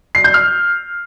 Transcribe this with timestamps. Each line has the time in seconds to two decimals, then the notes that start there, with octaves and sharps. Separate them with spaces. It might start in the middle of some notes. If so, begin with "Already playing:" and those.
0.15 C7
0.24 G6
0.34 F6